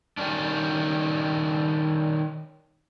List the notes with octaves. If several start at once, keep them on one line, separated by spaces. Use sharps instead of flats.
D#3 G3 C#4 D4